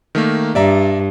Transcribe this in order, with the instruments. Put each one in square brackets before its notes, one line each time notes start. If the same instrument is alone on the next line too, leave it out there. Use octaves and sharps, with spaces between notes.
[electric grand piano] D#3 A3 A#3
[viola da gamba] G2 [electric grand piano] D5 E5 A#5